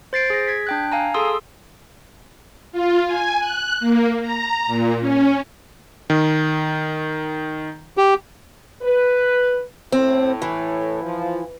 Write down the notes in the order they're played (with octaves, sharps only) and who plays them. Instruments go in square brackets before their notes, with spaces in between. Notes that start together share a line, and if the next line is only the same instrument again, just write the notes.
[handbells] C5 A6 C7 D7
G#4 A#6
G#6 B6
D4 G5 F#6
F5 G#5 A#5
G#4 A4 C6 D#6 E6
[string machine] F4
G#5
F#6
A#3
A#5
A#2
C#4
[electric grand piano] D#3
[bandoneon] G4
[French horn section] B4
[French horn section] A2 [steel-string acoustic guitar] C4
[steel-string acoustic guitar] E3
[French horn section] F3